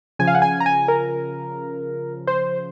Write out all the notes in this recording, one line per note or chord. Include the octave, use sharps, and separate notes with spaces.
C#3 F3 G#5
F5
F#5
G#5
A#5
G#5
A#4
C5